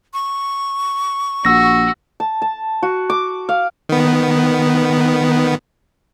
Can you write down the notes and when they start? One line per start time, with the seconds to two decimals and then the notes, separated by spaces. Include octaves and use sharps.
0.14 C#6
1.45 A#1 F#4 E6 A#6
2.20 A5
2.42 A5
2.83 F#4
3.10 D6
3.49 F5
3.89 D#3 B3